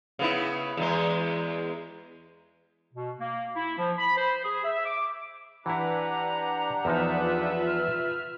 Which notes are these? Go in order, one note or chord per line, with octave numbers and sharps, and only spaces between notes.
C#3 B3 E4
E2 G#3
B2
A#3
E4
F3
B5
C5
G#4
E5
D6
E3 D4 E4 G4 B4 F#5 A#5
E2 F3 D#4 F4 B4 E5
F6